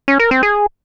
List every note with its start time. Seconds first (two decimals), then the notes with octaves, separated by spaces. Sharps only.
0.08 C#4
0.19 A#4
0.31 C4
0.43 G#4